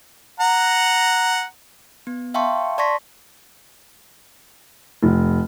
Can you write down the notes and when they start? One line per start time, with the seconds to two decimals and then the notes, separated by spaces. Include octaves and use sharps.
0.40 F#5 A#5
2.07 B3
2.34 E5 F5 G5 A5 C6 C#6
2.78 D5 A5 C6 C#6 A#6 B6
5.03 F1